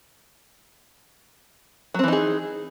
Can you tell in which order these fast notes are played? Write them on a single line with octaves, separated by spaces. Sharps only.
F#3 C4 E3 D#4 G#4